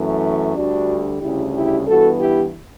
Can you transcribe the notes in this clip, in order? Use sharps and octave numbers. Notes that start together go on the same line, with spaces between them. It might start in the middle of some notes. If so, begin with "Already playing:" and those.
Already playing: F#2 E3 A3
D2 D3 G3 D4 F#4
D2 C#3 G3 E4 G4
E4 G4
G2 E3 B3 F#4 A4
E4 G4